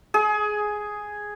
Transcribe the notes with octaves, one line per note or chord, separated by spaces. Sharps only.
G#4